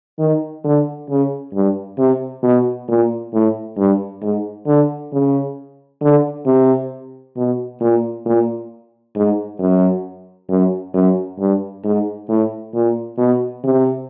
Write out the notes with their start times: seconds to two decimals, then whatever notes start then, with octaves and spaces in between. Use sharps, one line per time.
0.19 D#3
0.64 D3
1.10 C#3
1.54 G2
1.98 C3
2.44 B2
2.88 A#2
3.33 A2
3.77 G2
4.22 G#2
4.67 D3
5.13 C#3
6.02 D3
6.46 C3
7.37 B2
7.81 A#2
8.26 A#2
9.16 G#2
9.60 F#2
10.50 F#2
10.94 F#2
11.39 G2
11.85 G#2
12.29 A2
12.74 A#2
13.18 B2
13.64 C3